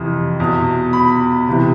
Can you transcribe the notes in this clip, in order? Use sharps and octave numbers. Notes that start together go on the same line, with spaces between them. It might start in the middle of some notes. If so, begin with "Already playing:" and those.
Already playing: F2 C3 E3
E2 B2
B5
E2 C3 E3